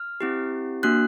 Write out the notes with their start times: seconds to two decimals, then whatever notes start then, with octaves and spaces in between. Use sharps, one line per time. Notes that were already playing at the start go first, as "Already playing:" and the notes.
Already playing: F6
0.21 C4 E4 G4
0.83 A#3 D4 F#4 F#6